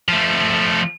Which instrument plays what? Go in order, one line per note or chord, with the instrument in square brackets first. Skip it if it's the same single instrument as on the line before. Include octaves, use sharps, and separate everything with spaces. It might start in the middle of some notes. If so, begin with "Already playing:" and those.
[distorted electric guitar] F3 A3